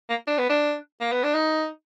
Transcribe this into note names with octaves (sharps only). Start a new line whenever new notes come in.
A#3
D4
B3
D4
A#3
B3
D4
D#4